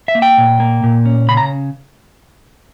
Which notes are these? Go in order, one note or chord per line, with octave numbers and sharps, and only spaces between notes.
E5
A#3
G5
A#2
A#3
A#2
C#4
C#3 B5
A#5